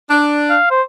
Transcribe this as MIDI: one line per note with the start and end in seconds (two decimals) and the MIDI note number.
0.10 0.56 62
0.50 0.68 77
0.71 0.82 72